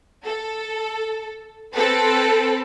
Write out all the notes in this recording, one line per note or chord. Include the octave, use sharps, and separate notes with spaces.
A4
C4 A4 B4